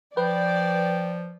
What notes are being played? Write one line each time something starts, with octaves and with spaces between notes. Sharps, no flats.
F3 B4 D5 G5